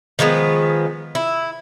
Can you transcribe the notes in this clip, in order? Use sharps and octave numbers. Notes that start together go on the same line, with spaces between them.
D#3 F3 G#3 B3
E4